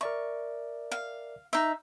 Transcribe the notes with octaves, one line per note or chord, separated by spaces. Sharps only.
A#4 D5 E5 C#6
F5
D#4 E5